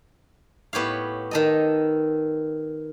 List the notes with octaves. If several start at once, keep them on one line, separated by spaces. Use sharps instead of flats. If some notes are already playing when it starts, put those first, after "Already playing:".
A2 B3 G4 C#5 F5
D#3 A4 D#5